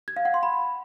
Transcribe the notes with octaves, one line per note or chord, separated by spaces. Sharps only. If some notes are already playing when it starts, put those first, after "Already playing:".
G#6
F5
F#5
C6
B5